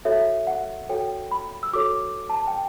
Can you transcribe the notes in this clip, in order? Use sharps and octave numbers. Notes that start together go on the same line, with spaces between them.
F#4 A4 C#5 E5
F#5
F#4 A4 C#5 G5
B5
E6
F#4 A4 C#5 D6
A5
G5